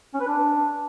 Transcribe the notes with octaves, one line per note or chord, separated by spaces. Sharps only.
C#4
B4
D4